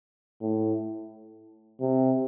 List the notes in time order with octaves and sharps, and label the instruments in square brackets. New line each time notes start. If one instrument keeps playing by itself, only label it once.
[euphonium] A2
C3